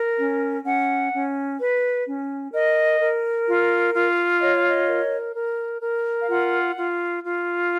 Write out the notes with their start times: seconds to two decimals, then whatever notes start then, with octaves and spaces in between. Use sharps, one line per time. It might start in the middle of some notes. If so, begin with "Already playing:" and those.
Already playing: A#4
0.18 C#4
0.65 C#4 F#5
1.13 C#4
1.59 B4
2.06 C#4
2.53 A#4 D#5
3.00 A#4
3.47 F4
3.93 F4
4.40 C#5 D#5
4.54 F5
4.67 D#5
4.88 A#4
5.35 A#4
5.81 A#4
6.19 F5
6.29 F4 F#5
6.76 F4
7.23 F4